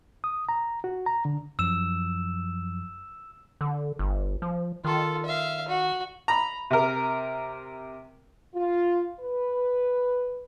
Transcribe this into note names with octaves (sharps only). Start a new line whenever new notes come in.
D#6
A#5
F#4
A#5
D3
F#2 F3 F#3 E6 E7
D3
G1
F3
D#3 F4 A4
E5 F5
F#4
A#5 B5
C3 A#4
F4
B4